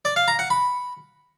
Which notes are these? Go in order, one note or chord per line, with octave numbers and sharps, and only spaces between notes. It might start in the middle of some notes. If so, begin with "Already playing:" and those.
D5
F5
A#5
F#5
B5